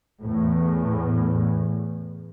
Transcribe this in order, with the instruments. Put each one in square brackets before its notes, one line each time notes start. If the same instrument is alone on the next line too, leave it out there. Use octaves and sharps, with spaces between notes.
[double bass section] E2 A2